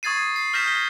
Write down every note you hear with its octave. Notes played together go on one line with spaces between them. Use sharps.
C#6 D#6 G#6 A6 C7 D#7
C7
D#6 F6 G6 A#6 B6 E7
G7